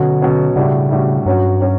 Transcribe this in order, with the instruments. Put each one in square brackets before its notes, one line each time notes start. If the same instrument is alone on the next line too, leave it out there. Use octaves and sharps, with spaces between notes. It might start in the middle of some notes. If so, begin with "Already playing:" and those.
Already playing: [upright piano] B2 F#3 C#4 F#4 [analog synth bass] D3
[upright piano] B2 F#3 C#4 F#4
[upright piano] A2 G3 D4 F#4 [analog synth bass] C#3
[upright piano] A2 G3 D4 F#4
[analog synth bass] G2 [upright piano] F#3 C#4 F#4
[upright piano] F#3 C#4 F#4